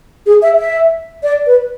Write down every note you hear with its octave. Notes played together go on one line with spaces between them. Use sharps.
G#4
E5
E5
D5
B4